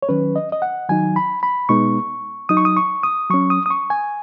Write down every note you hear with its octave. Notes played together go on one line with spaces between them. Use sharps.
C#5
D#3 F#3 C#4 B4
D#5
D#5
F#5
D#3 F#3 D#4 G#5
B5
B5
B2 G#3 B3 D#4 C#6
F#3 D#4 D#6
C#6
D#6
C#6
D#6
F#3 C#4 C#6
D#6
D#6
C#6
G#5